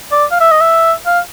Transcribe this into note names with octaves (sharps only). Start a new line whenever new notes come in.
D5
F5
E5
D#5
E5
F5